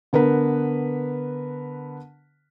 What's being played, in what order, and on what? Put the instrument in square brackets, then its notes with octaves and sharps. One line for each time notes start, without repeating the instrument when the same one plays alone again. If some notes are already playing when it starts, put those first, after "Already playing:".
[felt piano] D3 B3 A#4 B4